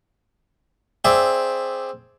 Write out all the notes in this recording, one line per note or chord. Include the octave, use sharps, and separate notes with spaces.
C4 G#4 D5 E5